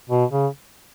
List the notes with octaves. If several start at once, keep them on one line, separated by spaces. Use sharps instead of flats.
B2
C#3